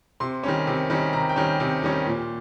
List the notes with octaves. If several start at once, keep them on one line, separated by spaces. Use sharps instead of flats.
C3 C6
D#3 G3 C#4
C3
D#3 G3 C#4
C3 A#5
G5
D#3 G3 C#4
C3
D#3 G3 C#4
A#2